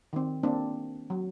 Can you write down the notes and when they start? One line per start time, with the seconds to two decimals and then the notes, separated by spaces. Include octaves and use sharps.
0.13 D#3 C4
0.43 A#3 C4 D4
1.10 F#3